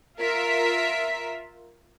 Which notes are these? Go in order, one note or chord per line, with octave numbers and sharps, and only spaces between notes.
F4 A#4 E5